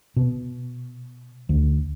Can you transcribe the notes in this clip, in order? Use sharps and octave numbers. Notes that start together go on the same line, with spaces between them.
B2
D2